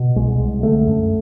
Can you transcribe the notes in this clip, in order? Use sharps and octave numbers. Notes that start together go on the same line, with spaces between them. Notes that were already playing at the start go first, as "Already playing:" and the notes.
Already playing: B2
C2 G#3
C2
D3 A3
F#2